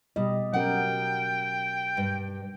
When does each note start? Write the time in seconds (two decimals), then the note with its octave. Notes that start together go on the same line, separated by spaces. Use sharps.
0.16 B2 G3 G4 D#5
0.54 F#3 C#4 A#4 F#5 G5
1.97 G2